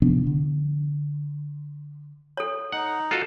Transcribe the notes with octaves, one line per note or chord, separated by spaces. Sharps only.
C3 F3 B3 D4
D3
A4 C#5
D#4 F#5
F4 F#4 A4